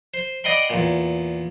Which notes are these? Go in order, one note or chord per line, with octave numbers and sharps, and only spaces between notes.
C5
D5 D#5 F#5 G5 B5 C6
E2 A#2